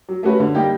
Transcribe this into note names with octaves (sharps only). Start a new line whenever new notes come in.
F#3
A3 C#4 F#4 B4
D3
G3 A#3 D#4 G4